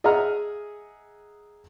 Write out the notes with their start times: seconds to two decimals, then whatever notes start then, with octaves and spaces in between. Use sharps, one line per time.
0.04 G#4 D#5 E5 F#5 A#5 F6